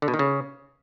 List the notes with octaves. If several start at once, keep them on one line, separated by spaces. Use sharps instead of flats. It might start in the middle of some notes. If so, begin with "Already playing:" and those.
D3
B2
D#3
C#3